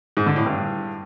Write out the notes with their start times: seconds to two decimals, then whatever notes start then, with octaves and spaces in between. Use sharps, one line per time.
0.17 G#2
0.26 D3
0.36 A2
0.46 G2